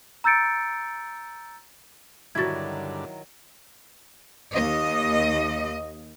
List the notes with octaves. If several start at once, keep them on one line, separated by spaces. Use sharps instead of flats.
A#5 E6 G6 A6 C#7 D7
G2 D3 D#3 F#3 E4 F#4 G#6 A6
D#2 D#5